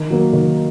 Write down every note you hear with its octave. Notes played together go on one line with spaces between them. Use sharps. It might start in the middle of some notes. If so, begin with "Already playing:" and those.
Already playing: D#3
F#3 A#3
D#3